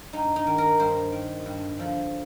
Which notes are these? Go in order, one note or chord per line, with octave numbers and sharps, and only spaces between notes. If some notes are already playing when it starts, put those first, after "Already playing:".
G2 D#4
D#4
D#3
A#4
G2 C5
D#3
G2
D3 F3